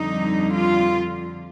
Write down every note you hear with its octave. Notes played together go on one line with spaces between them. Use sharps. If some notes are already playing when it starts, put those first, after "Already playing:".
Already playing: F2 D3 G3 D#4
F4